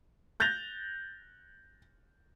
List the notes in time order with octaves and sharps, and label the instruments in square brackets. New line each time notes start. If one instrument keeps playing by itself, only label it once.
[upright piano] F#6 G6 A6 A#6 F7